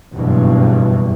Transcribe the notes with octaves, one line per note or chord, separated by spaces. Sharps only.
F#1 E2 G2 B2